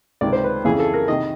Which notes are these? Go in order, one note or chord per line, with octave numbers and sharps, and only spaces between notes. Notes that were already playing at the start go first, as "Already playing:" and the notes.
C#2 C3 D#3 D5
C5
B4
F2 C#3 E3 G#4
A4
A#4
C3 D#3 D#5